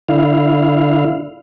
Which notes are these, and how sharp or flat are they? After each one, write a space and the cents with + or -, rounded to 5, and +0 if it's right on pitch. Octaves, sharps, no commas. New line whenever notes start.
D3 +0 E4 +0 F5 +0